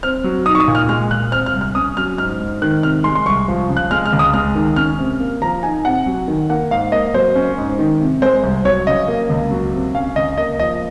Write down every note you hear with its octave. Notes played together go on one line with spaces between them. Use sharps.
C4 F6
F#3
D#4 D#6
C#6
D#6
A#2
F6
G#3 F6
A#2 F#6
C4 F6
F6
C2
F6
C#4 D#6
F#3 F6
G#2 F6
G#2
D#3 F#6
C3 F6
G#3 C6
C6
C2 C#6
F3
C#3
F#6
G#3 F6
F6
C#2
D#6
G#3 F6
D#3
C#4 F6
C3
A#3
F3 A#5
D#4 G#5
C3 F#5
F#3
D#3
A#3 F#5
G#2 F5
A#3 D#5
F#3 C5
C#4
G#2
D#3
C3
G#3 C5
C2
F#3 C#5
C#3 D#5
A#3
C#2
F#3
C3
C#4 F5
C#2 D#5
A#3 D#5
F3 D#5